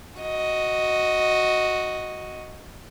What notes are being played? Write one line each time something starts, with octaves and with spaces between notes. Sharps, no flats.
F#4 D#5